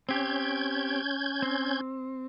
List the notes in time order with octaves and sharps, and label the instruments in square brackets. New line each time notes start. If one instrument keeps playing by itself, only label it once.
[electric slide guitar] C4 G4 [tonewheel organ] C#4 G6 G#6
[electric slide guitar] C4